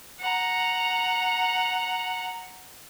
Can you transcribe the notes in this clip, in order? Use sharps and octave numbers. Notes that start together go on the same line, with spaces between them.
F#5 A#5